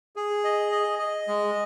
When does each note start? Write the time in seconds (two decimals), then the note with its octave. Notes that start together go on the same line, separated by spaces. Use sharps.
0.16 G#4
0.44 D#5
0.72 D#5
0.99 D#5
1.28 G#3